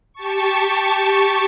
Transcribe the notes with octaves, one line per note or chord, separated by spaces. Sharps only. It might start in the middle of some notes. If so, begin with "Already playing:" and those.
G4 A5 C#6